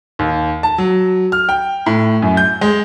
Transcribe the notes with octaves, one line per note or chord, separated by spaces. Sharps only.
D#2
A5
F#3
F6
G5
A2
F#2
G6
G#3